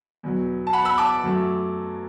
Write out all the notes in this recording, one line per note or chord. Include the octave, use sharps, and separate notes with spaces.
E2 B2 F#3
A5
F#5 B5
B5 E6
A5 D6
F#2 F#3 A3